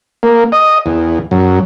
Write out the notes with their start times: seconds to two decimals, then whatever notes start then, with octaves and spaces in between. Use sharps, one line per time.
0.23 A#3
0.52 D#5
0.86 E2
1.31 F#2